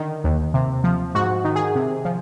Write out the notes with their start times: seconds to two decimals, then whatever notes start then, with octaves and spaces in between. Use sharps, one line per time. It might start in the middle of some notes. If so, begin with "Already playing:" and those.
Already playing: D3 D#3
0.24 D#2
0.54 C3
0.84 F3
1.15 G#2 F#4
1.44 D#3
1.56 G#4
1.75 C3
2.05 F3